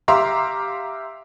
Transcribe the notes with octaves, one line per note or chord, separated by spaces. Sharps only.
G4 E5 F5 A#5 C6 D6